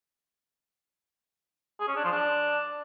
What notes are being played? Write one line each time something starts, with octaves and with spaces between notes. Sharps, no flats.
G#4
C#4
D4
F3
D4